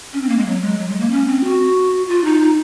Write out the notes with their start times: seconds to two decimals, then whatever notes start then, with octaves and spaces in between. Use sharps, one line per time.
0.13 C#4
0.21 C4
0.29 A#3
0.38 G#3
0.46 F#3
0.62 G#3
0.79 F#3
0.89 G#3
1.00 A#3
1.11 C#4
1.27 C4
1.44 F#4
2.08 F4
2.24 D#4
2.41 D#4